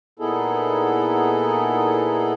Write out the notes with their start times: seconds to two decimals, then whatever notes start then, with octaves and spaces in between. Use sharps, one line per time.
0.19 A#2 B3 D#4 E4 G#4 A4